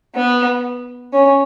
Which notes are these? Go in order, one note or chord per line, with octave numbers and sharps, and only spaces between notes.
B3
C#4